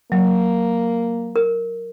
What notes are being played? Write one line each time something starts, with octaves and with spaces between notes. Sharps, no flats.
F#3 A#3
A#4